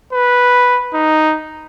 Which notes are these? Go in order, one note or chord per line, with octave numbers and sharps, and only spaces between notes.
B4
D#4